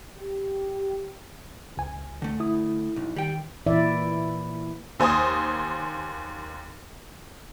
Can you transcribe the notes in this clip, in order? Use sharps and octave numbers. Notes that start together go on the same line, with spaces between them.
G4
C#2 G#5
D3 A3
E4 D#6
B1
D#3 G3 G5
A#2 E3 E4 D5 E5
D#2 C5 G#5 D#6